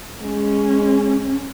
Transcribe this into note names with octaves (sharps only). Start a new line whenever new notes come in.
G#3 C#4